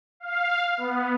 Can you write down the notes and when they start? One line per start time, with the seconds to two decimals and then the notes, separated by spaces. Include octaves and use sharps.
0.20 F5
0.77 B3